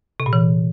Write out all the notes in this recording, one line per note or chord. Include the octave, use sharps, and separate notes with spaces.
C3
A#2
E3